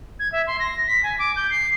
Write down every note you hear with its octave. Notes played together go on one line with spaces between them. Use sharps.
G#6
E5
C6
A#6
B6
G#5
D6
G6
C7